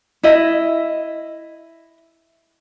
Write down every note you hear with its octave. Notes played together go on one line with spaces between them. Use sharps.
E4 D#5 E5